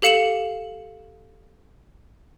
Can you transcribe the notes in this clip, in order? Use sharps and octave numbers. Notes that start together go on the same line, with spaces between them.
G4 A4 F5 C#7 E7 F#7